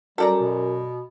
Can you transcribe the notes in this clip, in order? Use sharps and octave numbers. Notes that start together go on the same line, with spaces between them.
F#2 G3 A4 D5 A#5
B2